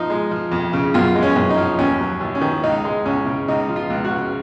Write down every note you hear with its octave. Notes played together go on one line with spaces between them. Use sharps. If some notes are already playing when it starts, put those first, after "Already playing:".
Already playing: F3 D#4
G#3
F3
F2
C#3
F#2 F4
G#3
C#4
F#2
D#4
F3
D#2 C#4
F#3
D#2
C#4
D#3
C#2 D#4
G#3
C#2 C#4
C#3
C#2 D#4
F3
F4
C#2
F#4
C#3